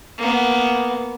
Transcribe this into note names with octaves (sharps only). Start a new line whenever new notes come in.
A#3 B3